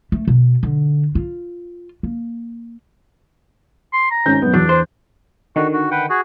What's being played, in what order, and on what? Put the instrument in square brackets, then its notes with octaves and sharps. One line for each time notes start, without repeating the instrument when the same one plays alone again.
[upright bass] A3
B2
D3
F4
A#3
[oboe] C6
A#5
[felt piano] G#1 C#4 G6
F#2 B3
[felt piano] E2 [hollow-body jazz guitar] F#3 [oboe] D4
[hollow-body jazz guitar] C5
[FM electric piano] D3 D#3 [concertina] F#4
[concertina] F#4
B4 F#5 G5
F#4 G#4